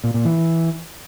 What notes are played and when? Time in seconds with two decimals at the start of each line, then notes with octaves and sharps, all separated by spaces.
0.04 A#2
0.14 A#2
0.25 E3